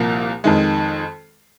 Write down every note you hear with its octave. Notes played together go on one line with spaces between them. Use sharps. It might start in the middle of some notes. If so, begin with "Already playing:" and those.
Already playing: C2 A#2 F3 A#3
F2 D#3 G#3